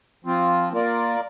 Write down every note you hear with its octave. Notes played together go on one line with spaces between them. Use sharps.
F3 C4 F4
A#3 F4 A#4 D5